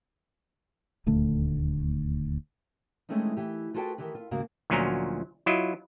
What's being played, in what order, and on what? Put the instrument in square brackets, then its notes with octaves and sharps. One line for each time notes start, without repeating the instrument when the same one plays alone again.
[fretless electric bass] D#1 D2 A3
[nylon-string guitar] E3 G#3 A3 C4 C#4 D#4
E3 G4
F4 F#4 G#4 A4 B4 G5
D#3 E3 G4 B4
F4
D#2 G#2 C#3 A#3 F#4 F5
[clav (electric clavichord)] D2 A#2 F3 F#3 C#4 A#5
F#3 E4 F4 D#5